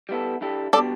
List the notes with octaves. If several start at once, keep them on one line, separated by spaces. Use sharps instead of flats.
G3 B3 E4 A4
G2 G3 E4 A4
B2 G3 D4 A4 D5